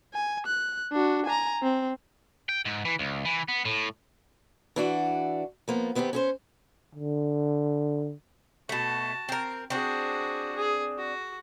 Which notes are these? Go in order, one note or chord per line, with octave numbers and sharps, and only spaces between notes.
G#5
F#6
D4 F#4
G#5 A#5
C4
G5
G#2
E3
C#2
E3
B3
A2
E3 D4 F#4
F3 A#3 B3
D#3 B3 C4 F#4 G4
C#4 G#4 C5
D3
B2 A3 F#4 A5
C4 A#4
C4 D4 F#4 G#4
G#4
F#4